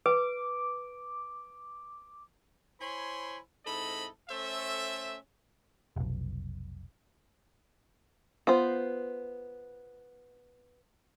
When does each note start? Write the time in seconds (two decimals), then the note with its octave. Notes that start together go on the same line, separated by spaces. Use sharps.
0.06 B4 D6
2.80 E4 C5 C#5 G#5 B5 C6
3.66 G#2 C4 E4 A4 D#5 B5
4.29 A3 C#4 A4 C5 E5
5.96 F1 B1
8.47 B3 F4 C5